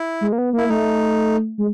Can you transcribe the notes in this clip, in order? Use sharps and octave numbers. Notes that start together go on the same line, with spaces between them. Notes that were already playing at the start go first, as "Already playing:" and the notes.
Already playing: E4
G#3
A#3
B3
A#3 E4
A3 D#4
G#3